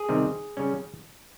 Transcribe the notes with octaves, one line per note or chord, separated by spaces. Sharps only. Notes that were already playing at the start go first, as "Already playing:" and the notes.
Already playing: G#4
C3 D#3 G3 C4
C#3 G3 C#4